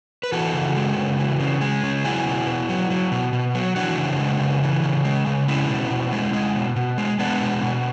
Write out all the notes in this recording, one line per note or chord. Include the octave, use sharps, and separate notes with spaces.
B4
E3 F#4 A4
C#3
G#3
C#3
E3
C#3
G#3
C#3
F#3 E4 G#4
B2
B2
F#3
F#3
B2
B2
F#3
E3 D4 F#4
C#3
G#3
C#3
E3
C#3
G#3
C#3
G#3 C#4 E4
B2
B2
G#3
G#3
B2
B2
G#3
G#3 B3 D4
B2
B2